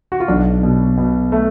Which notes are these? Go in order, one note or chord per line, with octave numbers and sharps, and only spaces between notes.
F#4
F4
B1 D4
B2
B2
A3